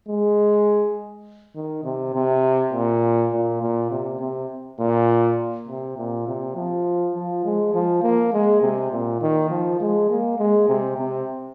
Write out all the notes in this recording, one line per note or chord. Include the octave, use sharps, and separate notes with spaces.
G#3
D#3
C3
C3
A#2
A#2
A#2
C3
C3
A#2
C3
A#2
C3
F3
F3
G#3
F3
A#3
G#3
C3
A#2
D#3
F3
G#3
A#3
G#3
C3
C3